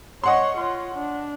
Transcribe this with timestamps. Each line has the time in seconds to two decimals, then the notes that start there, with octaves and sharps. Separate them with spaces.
0.24 C#5 D#5 F#5 C6 C#6
0.57 F4 C#5
0.95 D4